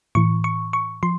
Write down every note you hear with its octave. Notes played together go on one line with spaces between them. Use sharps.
A2 E3 C#6
C#6
C#6
F3 C6